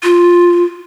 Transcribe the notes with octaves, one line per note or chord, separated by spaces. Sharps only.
F4